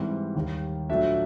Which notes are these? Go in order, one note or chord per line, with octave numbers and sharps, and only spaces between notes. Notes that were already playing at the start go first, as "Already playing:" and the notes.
Already playing: G#2 E3 G3 C4
D#2 D#3 G3
A#2 F#3 A3 D4 E5